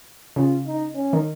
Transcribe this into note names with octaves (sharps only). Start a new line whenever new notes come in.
C#3 F4
D#4
C#4
D#3